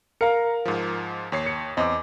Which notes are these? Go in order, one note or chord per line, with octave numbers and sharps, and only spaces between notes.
A#4 F5 A#5 C#7
G#2 F3
D#2 C#5 C7
C#7
E2 C4 D#5 D6